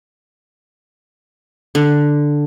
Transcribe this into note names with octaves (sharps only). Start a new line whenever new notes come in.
D3